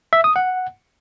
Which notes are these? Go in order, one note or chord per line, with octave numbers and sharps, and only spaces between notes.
E5
D#6
F#5